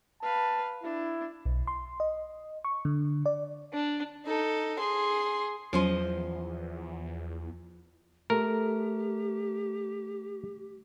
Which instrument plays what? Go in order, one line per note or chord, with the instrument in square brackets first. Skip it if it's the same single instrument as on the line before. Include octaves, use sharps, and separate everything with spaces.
[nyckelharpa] B4 F5 [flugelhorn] A5
[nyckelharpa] D4 [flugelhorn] E4
[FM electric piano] B1
C6
D#5
C#6
D3
D5
[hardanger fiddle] D4
[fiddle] D#4 A4
G#4 C6
[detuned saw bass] E2 [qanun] F3 C5 D#5 [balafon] F#3 C#4 C6
[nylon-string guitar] A3 [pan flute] G4 [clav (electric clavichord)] A#4